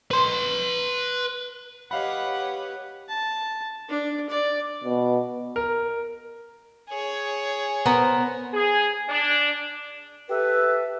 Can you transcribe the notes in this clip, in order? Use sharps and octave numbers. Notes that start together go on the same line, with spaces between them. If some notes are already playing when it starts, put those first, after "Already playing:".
B4 C6
G4 B4 C#5 D#5 F5 F#5 B5
A5
D4
D5
B2
A#4
G#4 C#5
B3 A#4 C5
G#4
D4
G4 A4 B4 E5